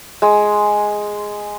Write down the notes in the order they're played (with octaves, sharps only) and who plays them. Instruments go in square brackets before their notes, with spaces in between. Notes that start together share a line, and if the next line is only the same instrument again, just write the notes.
[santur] G#3